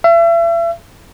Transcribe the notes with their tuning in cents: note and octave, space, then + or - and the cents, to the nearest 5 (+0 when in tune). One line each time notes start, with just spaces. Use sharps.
E5 +40